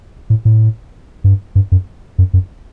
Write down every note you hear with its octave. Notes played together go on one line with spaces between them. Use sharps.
A2
A2
G2
G2
F#2
F#2
F#2